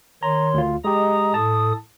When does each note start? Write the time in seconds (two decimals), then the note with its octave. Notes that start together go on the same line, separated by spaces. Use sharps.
0.23 D#3 C#5 A#5 C6
0.54 D2 F4
0.84 G#3 G4 D#5 A#5 D#6
1.34 A2 A4 A5 D#6